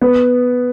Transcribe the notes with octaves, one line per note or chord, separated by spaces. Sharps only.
B3